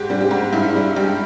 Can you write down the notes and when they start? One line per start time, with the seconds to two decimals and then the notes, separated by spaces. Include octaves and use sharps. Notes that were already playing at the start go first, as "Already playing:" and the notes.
Already playing: G#2 G4
0.10 G3
0.20 G4
0.31 G#2
0.53 G2 E4
0.75 G3
0.96 G2 G4